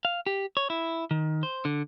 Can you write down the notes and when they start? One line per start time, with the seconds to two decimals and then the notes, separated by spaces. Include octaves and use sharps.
0.05 F5
0.26 G4
0.57 C#5
0.70 E4
1.11 D#3
1.43 C5
1.65 D3